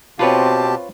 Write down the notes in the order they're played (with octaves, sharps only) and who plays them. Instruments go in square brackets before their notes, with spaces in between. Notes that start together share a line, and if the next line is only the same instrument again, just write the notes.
[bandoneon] B2 G4 A5 [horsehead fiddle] C4 [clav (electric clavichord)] F4 B4 C#5